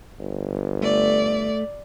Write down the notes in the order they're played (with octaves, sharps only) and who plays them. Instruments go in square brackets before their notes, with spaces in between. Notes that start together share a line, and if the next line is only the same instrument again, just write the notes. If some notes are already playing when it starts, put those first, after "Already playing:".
[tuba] G1
[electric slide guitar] A3 [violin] D5